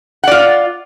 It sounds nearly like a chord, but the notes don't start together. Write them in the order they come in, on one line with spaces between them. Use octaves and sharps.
F#5 D5 F4